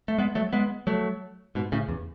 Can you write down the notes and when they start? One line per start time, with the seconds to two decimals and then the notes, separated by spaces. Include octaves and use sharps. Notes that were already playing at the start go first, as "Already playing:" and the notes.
0.08 A3
0.18 G#3 B3
0.35 F#3 A3
0.53 G#3 B3
0.87 F#3 A3
1.55 G#2 B2
1.72 A2 C#3
1.89 E2